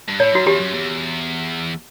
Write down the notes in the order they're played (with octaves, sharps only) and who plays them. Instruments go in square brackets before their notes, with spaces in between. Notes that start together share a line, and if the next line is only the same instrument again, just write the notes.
[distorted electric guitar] G2
[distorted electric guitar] A2 [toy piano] C#5
[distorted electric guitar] F#2 [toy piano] F#4
[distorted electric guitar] E2 [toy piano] G4
[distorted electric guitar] F#2
E2